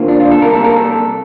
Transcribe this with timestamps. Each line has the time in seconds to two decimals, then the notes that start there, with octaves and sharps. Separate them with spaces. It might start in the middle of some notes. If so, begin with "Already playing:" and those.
Already playing: F2 D3 F3 A#3
0.08 D4
0.20 F4
0.31 A4
0.42 C3 G3 A#3 A#4
0.53 A4
0.64 A#4
0.76 A4